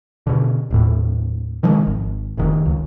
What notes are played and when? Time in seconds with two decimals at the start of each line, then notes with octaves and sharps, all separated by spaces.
0.27 B2 D3
0.71 D#1 A2
1.63 C3 D#3 F3 G#3
1.87 G#1
2.37 F1 D#3
2.66 C#2